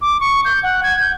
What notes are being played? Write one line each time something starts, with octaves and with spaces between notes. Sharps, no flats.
D6
C#6
G6
F#5
G#6
G6